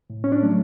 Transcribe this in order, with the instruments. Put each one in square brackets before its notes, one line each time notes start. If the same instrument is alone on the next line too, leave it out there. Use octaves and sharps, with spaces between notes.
[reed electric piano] A2
C#4
D4
F#3 A3